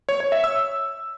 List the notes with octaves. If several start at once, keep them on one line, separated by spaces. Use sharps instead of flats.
C#5
C#5
E5
E6